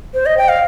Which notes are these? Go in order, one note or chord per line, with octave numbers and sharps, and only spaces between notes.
C5
D#5
G5
F5